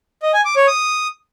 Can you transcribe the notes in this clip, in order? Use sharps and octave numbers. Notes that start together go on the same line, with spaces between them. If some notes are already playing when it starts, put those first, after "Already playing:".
D#5
G#5
D6
C#5
D#6